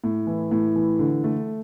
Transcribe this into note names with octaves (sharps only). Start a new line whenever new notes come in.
A2
E3
A2
E3
D3
A3